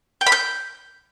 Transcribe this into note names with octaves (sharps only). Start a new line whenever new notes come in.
G5
B5
G6